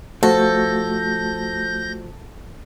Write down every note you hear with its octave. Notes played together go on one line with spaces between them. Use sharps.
F3 A3 F#4 A4 G6 A#6